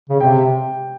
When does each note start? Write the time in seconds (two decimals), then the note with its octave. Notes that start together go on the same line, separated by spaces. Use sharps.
0.09 C#3
0.20 C3 G5